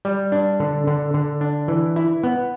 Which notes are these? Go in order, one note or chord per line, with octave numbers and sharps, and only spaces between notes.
G3
D4
D3
D3
D3
D4
E3
E4
B3